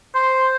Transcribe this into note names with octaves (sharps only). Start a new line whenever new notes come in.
C5